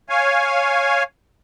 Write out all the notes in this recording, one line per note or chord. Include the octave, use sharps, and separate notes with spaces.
C#5 F5 G#5